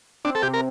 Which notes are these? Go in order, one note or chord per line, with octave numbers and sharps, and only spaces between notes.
C4 D4
A4
C3 G4
A#4